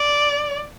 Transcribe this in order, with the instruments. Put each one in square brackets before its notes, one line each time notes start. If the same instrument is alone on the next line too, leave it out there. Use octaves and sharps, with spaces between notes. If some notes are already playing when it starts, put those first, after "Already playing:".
Already playing: [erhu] D5